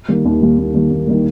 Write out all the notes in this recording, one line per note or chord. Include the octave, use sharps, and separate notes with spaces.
D#3 G3 A#3
D#2
D#3 G3 A#3
D#2
D#3 G3 A#3
D#2
D#3 G3 A#3